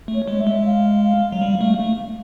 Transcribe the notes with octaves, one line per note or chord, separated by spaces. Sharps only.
A3
C#5
G#3
E5
G#3
F5
F#3
G3
A3
A3